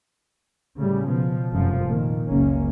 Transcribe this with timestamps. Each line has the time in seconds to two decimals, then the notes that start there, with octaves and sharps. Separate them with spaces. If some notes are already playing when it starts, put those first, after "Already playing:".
0.78 A2 C#3 G3
1.07 B2 F3
1.52 F1 F#2 F3
1.88 A#2 D#3
2.27 F#1 C#2 A#3 C#4